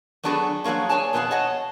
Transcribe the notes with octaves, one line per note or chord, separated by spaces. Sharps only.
F#3 B3 D4 F#4 G#4 A4
F3 F#3 G#3 A#3 C#4
G#4 C#5 D5 G#5 A5
F2 B2 B3 E4 G#4 A5
C#5 D#5 F#5 A5